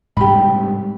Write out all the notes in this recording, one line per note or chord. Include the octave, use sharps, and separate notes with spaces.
G#2 C3 G3 G4 B5